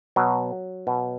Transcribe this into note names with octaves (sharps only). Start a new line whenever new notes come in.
B2 F#3
B2